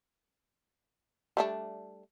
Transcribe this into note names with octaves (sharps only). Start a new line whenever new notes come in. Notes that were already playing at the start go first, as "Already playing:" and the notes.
G3 A3 D4